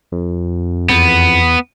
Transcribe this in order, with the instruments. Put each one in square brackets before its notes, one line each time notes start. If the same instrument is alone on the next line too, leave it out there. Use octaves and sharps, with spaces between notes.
[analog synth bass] F2
[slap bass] E2 [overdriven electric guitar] B3